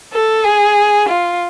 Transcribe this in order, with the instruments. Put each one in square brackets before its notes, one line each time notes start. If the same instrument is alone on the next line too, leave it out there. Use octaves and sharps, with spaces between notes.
[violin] A4
G#4
F4